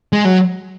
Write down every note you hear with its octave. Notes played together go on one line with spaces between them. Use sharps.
G#3
F#3